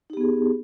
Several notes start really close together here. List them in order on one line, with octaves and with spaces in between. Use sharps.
D#4 G4 B3 G#4